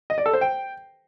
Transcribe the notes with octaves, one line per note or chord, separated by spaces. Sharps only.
D#5
D5
A4
C5
G5